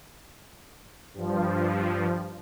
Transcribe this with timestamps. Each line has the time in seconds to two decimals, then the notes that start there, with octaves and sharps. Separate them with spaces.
1.14 G2 F3